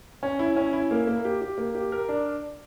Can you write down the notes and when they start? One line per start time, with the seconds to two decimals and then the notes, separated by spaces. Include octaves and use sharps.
0.23 C#4
0.39 E4
0.56 C#4
0.73 E4
0.91 A#3
1.07 A#3
1.25 G4
1.41 G4
1.58 A#3
1.75 G4
1.92 A#4
2.09 D4